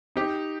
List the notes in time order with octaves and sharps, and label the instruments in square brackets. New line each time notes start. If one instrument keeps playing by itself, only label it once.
[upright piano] D#4 G4